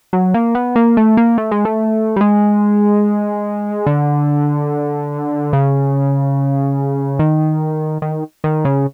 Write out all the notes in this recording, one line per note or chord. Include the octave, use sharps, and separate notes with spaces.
F#3
A#3
B3
A#3
A3
A#3
A3
G#3
A3
G3
G#3
D3
C#3
D#3
D#3
D#3
C#3